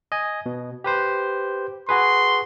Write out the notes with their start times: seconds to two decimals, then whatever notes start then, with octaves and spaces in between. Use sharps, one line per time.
0.12 D#5 G#5
0.46 B2
0.84 G4 B4 C5
1.89 F#4 G#4 B4 C6